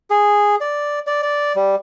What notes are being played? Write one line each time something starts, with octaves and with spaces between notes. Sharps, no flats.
G#4
D5
D5
D5
G3